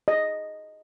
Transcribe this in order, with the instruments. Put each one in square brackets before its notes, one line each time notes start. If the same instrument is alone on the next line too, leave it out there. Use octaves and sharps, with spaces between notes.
[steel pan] D#5